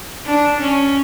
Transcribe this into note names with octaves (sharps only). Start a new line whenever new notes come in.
D4
C#4